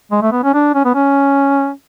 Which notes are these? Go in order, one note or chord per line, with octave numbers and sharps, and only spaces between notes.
G#3
A3
B3
C#4
D4
C#4
B3
C#4